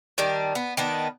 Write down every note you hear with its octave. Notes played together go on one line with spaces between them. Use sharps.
D#3 G3 D4
B3
D#3 B3 D4